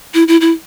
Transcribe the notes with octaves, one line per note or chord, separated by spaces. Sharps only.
E4
E4
E4